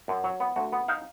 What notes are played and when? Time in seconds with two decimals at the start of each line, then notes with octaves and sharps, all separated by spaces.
0.08 F#2
0.24 F#3
0.40 B3
0.56 D2 F#4
0.72 B3
0.88 D#4 F5